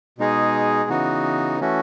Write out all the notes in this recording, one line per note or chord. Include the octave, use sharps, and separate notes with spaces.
B2 G#3 D#4 G#4
C#3 E3 B3 D#4 F#4
E3 A3 C#4 F#4